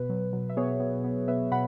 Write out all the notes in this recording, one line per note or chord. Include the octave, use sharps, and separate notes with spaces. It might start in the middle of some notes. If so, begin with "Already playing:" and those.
Already playing: B2 B4
F#3
F#3
E5
B3 G#4 C#5
B3
B3
B3 B4 E5
B2 F#5 B5